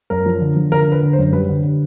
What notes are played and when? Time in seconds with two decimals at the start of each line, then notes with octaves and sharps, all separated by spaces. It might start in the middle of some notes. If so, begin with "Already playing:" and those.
0.10 F#2 A#4
0.26 F3
0.41 D3
0.56 F3
0.71 D3 A#4
0.87 D3 B4
1.03 D3
1.13 C5
1.18 F#2
1.33 G3 B4
1.49 D3
1.64 D3